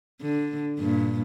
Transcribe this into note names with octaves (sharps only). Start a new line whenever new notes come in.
D3
G2 A#2